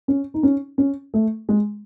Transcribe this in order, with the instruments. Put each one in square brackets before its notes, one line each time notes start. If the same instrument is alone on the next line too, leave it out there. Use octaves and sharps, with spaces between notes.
[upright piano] C#4
D#4
C#4
C#4
A3
G#3